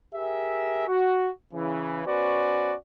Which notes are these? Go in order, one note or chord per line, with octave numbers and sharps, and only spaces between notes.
G4 G#4 A#4 E5
F#4
C#3 E3
B2 C#4 F#4 B4 C5 D5